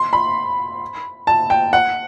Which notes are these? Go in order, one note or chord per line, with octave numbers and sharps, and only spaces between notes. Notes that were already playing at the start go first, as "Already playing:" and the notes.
Already playing: C6
B5
A5
G5
F#5